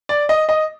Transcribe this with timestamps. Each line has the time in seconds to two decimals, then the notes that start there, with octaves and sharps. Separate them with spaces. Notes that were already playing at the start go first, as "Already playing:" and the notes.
0.09 D5
0.29 D#5
0.49 D#5